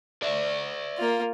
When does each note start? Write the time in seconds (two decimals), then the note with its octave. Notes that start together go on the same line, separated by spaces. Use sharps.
0.22 D5 E5
0.98 A#3 F4